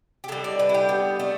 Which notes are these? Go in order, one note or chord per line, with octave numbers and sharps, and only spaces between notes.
G4
D3 G3 A4
D5
B4
E4
G4
B3
A3